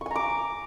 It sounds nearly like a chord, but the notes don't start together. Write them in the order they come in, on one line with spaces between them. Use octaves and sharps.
C#6 G#5 A#5 D6